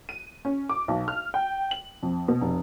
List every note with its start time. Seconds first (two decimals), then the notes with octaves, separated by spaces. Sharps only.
0.09 D#7
0.45 C#4
0.69 D6
0.88 B1
1.08 F6
1.34 G5
1.71 F#7
2.03 F2
2.28 B2
2.42 F1